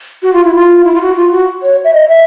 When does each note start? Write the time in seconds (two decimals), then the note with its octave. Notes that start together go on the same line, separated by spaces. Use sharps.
0.23 F#4
0.33 F4
0.44 E4
0.54 F4
0.84 E4
0.95 F4
1.01 F#4
1.16 F4
1.32 F#4
1.63 C#5
1.84 E5
1.94 D#5
2.08 E5